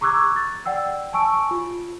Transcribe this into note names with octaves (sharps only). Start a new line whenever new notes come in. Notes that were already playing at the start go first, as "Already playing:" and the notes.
A#5 C#6 D6 E6 F#6 G#6
A6
D5 F#5 G5 E6
G#5 A5 C#6 E6 D7
F4